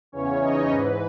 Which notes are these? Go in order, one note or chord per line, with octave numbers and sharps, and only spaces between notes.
E2 C#3 E3 C#4 C#5
D#4 D#5
G#2 E3 B4